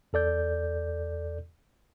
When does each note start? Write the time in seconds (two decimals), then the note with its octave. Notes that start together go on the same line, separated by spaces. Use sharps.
0.13 E2 A4 D5 G6